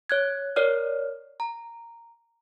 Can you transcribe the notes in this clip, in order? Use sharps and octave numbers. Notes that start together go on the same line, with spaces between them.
C#5 F#6 G#6
A#4 C#5 D5 F6
A#5